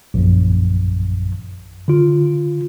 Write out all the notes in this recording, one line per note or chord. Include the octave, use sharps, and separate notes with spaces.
A#1 F#2
D3 F4